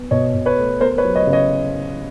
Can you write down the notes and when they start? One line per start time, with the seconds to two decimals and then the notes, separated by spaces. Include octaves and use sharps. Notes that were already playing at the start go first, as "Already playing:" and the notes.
Already playing: B3
0.11 B2 C#5 D#5
0.34 B2
0.46 B4 C#5
0.58 A3
0.80 B3 A#4 C5
0.98 B4 C#5
1.04 F#3
1.16 C#5 D#5
1.27 C#3
1.33 C#5 D#5